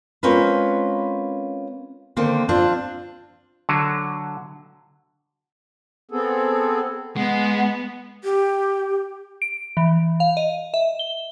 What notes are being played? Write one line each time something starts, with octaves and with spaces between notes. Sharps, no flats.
G#3 C4 C#4 F4 A#4 B4
D3 D#3 A#3 C4
C4 D4 F4
D3 F#3
B3 C4 G#4 A4
G#3 B3 F#5
G4
D7
E3
F5
D#5
E5
G7